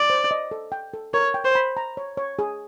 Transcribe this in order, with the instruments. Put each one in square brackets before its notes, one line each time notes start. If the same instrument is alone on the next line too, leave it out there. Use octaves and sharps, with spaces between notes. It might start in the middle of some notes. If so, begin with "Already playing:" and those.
Already playing: [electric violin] D5
[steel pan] C5
D#5
A4
G5
A4
[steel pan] A#4 [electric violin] C#5
[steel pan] G5
[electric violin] C5
[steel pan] B5
A#5
C#5
C#5
G#4